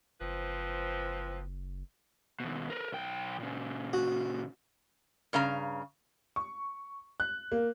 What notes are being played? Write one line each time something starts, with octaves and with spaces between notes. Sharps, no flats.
F#1 F3 C4 B4
D#2 B2
A#4 B4
B1 G5
A#2 C#3
F#4
G2 C#3 F5 A#5
C#6
F#6
A#3